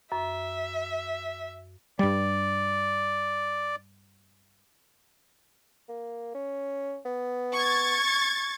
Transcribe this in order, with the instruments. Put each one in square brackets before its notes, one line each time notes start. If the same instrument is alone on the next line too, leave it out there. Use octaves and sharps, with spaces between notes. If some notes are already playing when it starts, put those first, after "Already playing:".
[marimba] F#2 [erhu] E5
[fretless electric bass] G2 G3 [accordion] D5
[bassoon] A#3
C#4
B3
[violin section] C#6 G#6 A6